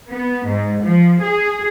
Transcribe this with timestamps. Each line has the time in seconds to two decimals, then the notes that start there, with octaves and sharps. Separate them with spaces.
0.11 B3
0.48 G#2
0.83 F3
1.22 G#4